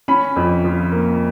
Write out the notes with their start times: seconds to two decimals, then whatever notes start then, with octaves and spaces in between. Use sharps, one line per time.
0.08 C#4 B5
0.36 F2
0.64 F3
0.92 A#3